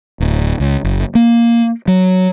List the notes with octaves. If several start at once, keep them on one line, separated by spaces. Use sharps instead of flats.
D1
C#2
F#1
A#3
F#3